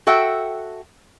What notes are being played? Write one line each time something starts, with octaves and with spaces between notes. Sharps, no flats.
F#4 A4 E5 F#5 G5